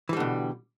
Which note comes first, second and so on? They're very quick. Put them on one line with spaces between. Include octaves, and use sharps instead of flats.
E3 G3 D3 B2